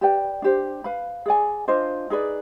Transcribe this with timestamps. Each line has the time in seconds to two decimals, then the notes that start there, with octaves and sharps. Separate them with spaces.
0.01 G4 B4 D5 G5
0.42 D4 G4 C5
0.84 B4 F5 B5
1.26 G#4 D5 G#5
1.68 D4 F4 C5 D#5
2.10 D#4 G#4 B4 D5